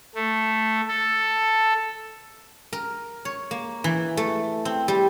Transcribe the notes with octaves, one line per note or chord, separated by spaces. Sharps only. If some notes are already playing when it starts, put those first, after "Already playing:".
A3
A4
A#4
C#5
A#3
E3
A3
C4
G3